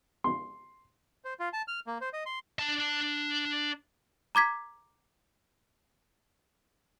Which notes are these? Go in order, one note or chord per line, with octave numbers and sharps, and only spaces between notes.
C6
C5
F4
A5
F6
A#3
C5
D#5
C6
D4 A5
A#5 D6 G#6 B6